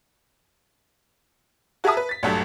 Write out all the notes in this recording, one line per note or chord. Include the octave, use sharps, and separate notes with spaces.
F#4 G#4 A#4 E5 A5 D#6
B4
A6 B6
A#1 G2 F#3 A3